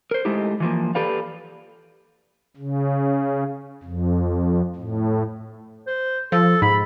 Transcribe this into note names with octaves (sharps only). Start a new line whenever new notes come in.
A#4 C5
G#3 A3 D#4 E4 G4
E3 F3 A#3
G4 A4 B4 D5 F5
C#3
F2
A2
C5
F3 A4
G#2 B5